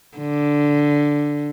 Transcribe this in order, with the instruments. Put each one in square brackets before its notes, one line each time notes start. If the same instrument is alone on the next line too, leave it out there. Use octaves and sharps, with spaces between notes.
[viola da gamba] D3